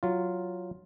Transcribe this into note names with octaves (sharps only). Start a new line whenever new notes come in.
F#3 F4